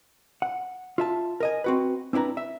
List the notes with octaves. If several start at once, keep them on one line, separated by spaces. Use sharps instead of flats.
F#5
F4 E5 A5
A#4 D#5 G#5
C4 F#4 B4
C4 D4 E4 B4 A#5
E5